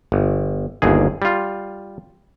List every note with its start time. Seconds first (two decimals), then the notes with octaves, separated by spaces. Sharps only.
0.12 G1
0.82 G1 D#2 G#4
1.22 G3 F4